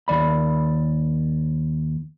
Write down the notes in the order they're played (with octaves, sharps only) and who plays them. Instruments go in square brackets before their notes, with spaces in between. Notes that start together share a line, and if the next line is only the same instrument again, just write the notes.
[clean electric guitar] D#2 D5 B5